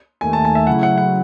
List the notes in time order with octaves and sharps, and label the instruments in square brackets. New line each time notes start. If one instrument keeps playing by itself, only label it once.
[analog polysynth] D#2 D#3 A3 [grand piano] G#5
[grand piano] A5
G#5
E5
[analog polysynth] C#3 F#3 A3 E4 [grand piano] F#5
[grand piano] F#5
F#5